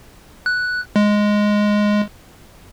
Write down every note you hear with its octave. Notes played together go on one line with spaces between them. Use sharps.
F#6
G#3